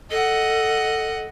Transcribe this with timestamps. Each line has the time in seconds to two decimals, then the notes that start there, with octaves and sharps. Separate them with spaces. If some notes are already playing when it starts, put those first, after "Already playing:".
0.11 A4 D#5 F#5